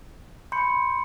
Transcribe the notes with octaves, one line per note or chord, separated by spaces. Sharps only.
B5 C6 G6 C#7